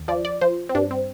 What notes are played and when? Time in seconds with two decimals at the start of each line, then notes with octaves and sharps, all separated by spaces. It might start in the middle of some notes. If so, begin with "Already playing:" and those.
Already playing: D#2
0.08 F3 D5
0.25 D5
0.41 F3 C5
0.69 C4
0.75 G2 D4
0.91 C4